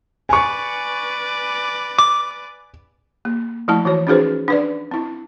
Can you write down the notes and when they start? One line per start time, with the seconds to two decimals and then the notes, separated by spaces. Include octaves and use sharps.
0.29 B4 D5 G#5 C#6
1.99 D6
3.25 A#3
3.68 F3 A3 E4 A5
3.85 E3 F#4 C#5
4.07 C#4 D#4 F#4 G#4 B4 C5
4.48 D4 B4 D5
4.91 C4 E4